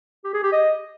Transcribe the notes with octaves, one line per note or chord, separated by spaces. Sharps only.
G4
G#4
G4
D#5